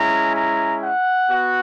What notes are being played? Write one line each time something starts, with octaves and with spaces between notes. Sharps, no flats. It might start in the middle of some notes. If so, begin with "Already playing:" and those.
Already playing: G#3 C#4 E4 A#5
A#5
F#5
B3 F#4